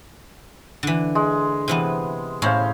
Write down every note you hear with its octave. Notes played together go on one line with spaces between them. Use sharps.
D3 E3
G#3
C3 E3 B3
A2 C#4 E4 C5 F5